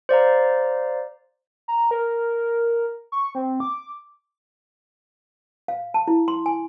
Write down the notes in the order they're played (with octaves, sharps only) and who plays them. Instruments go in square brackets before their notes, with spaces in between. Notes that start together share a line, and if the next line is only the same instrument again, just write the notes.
[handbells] C5 D5 F5 A#5
[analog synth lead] A#5
A#4
C#6
C4
D6
[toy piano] F5
A5
E4
C6
G#5